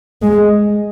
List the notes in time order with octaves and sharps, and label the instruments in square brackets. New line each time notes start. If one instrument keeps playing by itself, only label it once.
[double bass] G#3